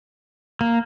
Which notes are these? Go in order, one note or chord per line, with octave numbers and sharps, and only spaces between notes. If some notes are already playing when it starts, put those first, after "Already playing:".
A#3